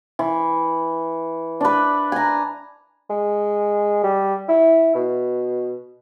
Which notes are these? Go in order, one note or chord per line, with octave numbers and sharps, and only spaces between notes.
E3
D4 B4
G#5 A#5
G#3
G3
E4
B2